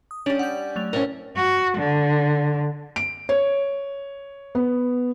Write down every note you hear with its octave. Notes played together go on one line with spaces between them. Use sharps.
D#6
G3 C#4 D4 F7 F#7
F#5 G6
F#3 A3 F7
A2 C#4 A#4 C5 C#5
F#4
D3
D7
C#5
B3